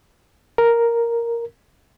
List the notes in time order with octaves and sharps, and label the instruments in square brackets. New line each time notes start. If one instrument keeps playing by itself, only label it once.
[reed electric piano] A#4